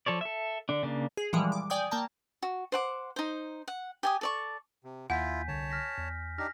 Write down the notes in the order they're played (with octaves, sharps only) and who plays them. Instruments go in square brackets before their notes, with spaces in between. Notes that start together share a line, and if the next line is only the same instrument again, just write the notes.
[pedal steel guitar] F3 A4 C#5 D5
A4 E5
D3 D4
C#3 A#3 D4
[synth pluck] G#4
A#2 E3 F3 G3 G#3
D6
D5 G5 G#5 D#6 G6
A#3 G5 A5 A#5
[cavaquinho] F#4
C5 F#5 D6
D#4 C5
F#5
G4 G#5 D#6
A4 D5 C#6
[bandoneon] C3
[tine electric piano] D#2 [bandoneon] E4 F4 [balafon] F#5 [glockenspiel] G#5 G6 B6
[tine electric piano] C2 D3 [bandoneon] C#5 A5
[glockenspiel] F6 A#6 B6
[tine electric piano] E2
[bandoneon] D4 D#4 G4 [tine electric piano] F6 [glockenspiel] A#6